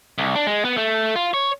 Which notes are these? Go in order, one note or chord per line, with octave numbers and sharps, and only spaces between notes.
C2
D4
G#3
B3
A3
F4
C#5